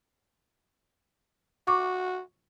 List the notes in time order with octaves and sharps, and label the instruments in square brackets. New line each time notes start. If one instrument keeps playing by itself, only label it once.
[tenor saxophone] F#4 [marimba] C#6 D6